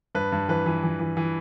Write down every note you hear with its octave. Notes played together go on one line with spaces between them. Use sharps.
G2 B4
G2
E3 B4
E3
E3
E3
E3